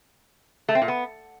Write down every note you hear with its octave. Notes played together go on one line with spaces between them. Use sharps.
A3
C4
A#2
B3